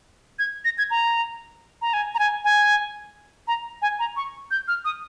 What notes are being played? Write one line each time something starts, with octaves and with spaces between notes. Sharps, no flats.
G#6
A#6
G#6
A#5
A#5
G#5
A#5
G#5
G#5
A#5
G#5
A#5
C#6
G6
F6
D#6